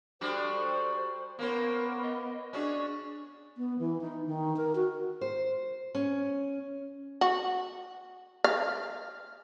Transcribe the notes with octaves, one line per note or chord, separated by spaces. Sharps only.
G3 D4 F#4 A4 C5
A#3 B3 C#4 A#4 C5
D#5
C#4 D4 F#4 G#4 D5
B3
E3
D#4
D#3
A#4
F#4
C5
C#4
F#4
F5